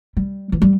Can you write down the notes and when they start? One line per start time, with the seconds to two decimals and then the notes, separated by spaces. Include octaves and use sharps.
0.17 G3
0.52 E3
0.62 G3